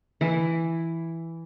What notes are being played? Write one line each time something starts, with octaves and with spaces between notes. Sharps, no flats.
E3 E4